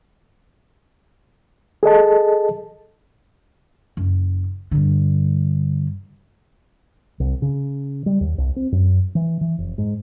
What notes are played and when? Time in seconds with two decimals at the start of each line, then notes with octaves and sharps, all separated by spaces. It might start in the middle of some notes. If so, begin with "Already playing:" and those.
1.83 G#4 A4 D#5 A5
3.97 F#1
4.71 G2 D3
7.20 C2
7.42 C#3
8.06 G3
8.21 D#2
8.38 C2
8.56 C4
8.72 F#2
9.15 E3
9.41 E3
9.58 F1
9.78 G#2